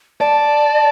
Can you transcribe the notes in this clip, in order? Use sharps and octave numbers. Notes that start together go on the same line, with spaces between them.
D5 A5